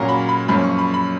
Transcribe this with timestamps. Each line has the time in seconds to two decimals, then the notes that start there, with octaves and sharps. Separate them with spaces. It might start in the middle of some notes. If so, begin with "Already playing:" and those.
Already playing: A#2 F#3 A#3 C#4 A#5
0.09 B5
0.29 B5
0.48 F#2 F3 A#3 C#4 B5
0.64 C#6
0.78 B5
0.94 B5